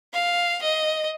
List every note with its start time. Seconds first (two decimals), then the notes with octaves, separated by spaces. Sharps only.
0.13 F5
0.62 D#5